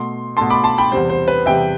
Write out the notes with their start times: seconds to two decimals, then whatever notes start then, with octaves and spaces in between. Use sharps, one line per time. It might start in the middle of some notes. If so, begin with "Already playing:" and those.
Already playing: B2 A3 C6
0.37 B2 A3 A5 C6
0.50 B5 D6
0.64 A5 C6
0.78 G5 B5
0.92 E2 C3 G3 C5
1.10 C5
1.28 B4
1.46 E2 C3 G3 E5 G5